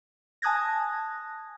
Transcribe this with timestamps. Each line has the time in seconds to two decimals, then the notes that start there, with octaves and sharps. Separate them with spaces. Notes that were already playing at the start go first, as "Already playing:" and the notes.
0.42 G#5 A5 D#6 F#6 G#6 A#6